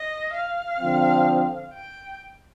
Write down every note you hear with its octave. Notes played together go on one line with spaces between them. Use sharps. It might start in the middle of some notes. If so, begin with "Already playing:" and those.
Already playing: D#5
F5
D3 F3 C4
G5